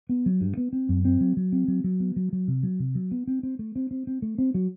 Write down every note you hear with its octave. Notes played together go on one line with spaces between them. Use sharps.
B3
F#3
G2
B3
C4
F#2
C4
F#3
F#3
C4
F#3
F#3
B3
F#3
F#3
C3
F#3
C3
F#3
B3
C4
C4
A3
C4
C4
C4
A3
C4
F#3